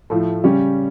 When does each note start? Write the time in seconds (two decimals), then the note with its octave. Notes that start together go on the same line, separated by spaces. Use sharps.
0.10 A2 F3 A3
0.44 C#3 G3 C#4 G4